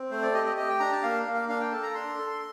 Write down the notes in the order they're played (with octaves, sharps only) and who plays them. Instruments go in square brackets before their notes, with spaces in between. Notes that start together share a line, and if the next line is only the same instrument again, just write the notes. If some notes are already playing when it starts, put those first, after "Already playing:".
Already playing: [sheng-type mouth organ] C4
A3 C5
D5
G4 D#5
D#5
G4 D#5
G5
D4 A#5
A5
A#3 F5
A#3
F5
D4 F5
G5
A4 A5
A#5
D4 C6
A4